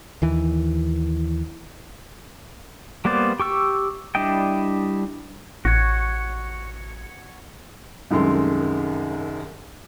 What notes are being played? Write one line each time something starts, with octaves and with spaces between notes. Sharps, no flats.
D#2 E3
G3 A#3 B3 C5 D5
G4 C#6 E6
G3 D4 E4 D#5 G5
A1 F#4 C#5
C2 F#2 D#3 G#3 A4 C6